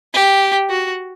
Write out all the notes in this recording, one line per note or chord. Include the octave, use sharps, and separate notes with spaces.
G4
F#4